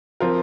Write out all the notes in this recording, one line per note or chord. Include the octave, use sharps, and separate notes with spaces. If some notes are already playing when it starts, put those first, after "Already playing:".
F3 C4 F4 A#4